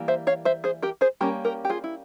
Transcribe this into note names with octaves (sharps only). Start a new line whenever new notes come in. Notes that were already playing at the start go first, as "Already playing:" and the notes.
Already playing: E3 G3 A#3
C5 E5
C#5 F5
C5 E5
G#4 C5
G4 A#4
G#4 C5
G3 A#3 C#4 G4 A#4
G4 A#4
G4
F4 G#4
E4